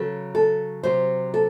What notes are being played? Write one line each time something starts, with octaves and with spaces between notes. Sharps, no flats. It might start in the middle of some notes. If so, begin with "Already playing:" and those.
Already playing: C#3 F#3 A4
A4
C3 F#3 C5
A4